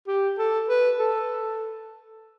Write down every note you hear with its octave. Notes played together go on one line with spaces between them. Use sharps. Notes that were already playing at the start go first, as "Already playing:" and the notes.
G4
A4
B4
A4